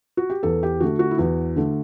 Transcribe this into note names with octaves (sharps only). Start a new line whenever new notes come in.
F#4
G4
E2 A4
G4
D3 A3 F#4
F#4
E4
E2 F#4
D3 A3